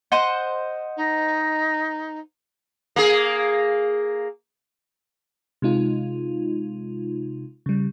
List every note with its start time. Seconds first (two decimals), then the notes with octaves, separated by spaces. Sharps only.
0.12 C5 D#5 F#5
0.96 D#4
2.96 A#3 G#4
5.62 C3 G#3 D#4 F4
7.66 C#3 G3